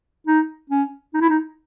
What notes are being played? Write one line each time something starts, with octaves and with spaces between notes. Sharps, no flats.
D#4
C#4
D#4
E4
D#4